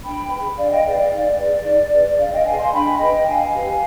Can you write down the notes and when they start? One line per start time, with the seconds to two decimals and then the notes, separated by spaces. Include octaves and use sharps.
0.04 D4 G5 B5
0.31 G#4 B4
0.57 D4 D5 F5
0.71 D#5 G5
0.85 G#4 B4 D5 F5
0.99 D5 F5
1.12 D#4 D5
1.38 G#4 B4
1.65 D#4
1.92 G#4 B4
2.19 D4 D5 F5
2.33 D#5 G5
2.46 G#4 B4 F5 G#5
2.59 G#5 C6
2.73 D4 G5 B5
2.99 G#4 B4 D#5 G5
3.26 D4 F5 G#5
3.53 G4 B4